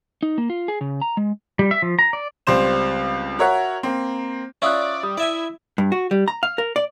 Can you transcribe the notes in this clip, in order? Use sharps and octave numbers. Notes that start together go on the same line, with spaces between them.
D#4
A#3
F4
G#4
C#3
A#5
G#3
G3
E5
F3
A#5
D5
C#2 G3 C4 C5 E7
F#4 A#4 C#5 E5 F#5
A#3 C4
C#4 E4 F4 D5 C#6 D#6 F#6
G3 D#6
E4 D5 E5 G#5
G2
F#4
G3
A#5
F5
A#4
D5